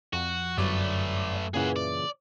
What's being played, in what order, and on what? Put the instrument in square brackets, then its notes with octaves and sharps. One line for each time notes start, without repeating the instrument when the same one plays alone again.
[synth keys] F2 [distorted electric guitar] F#4
[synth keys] G1 C#5 D5 [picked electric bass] F#2 [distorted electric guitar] A3 B4
[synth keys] A#2 C#3 E3 [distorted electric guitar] G#4 F#5
[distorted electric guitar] D5